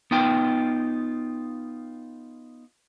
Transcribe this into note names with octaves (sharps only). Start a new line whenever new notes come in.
B3 D#4 F4 G5